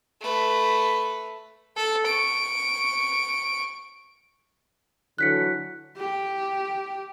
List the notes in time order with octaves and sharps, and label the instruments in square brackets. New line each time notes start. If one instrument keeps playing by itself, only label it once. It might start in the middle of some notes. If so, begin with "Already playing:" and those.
[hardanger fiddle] A3 B4
[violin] A4
C#6 D7
[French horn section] D3 E3 F#3 [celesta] F#6 B6 C#7
[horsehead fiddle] G4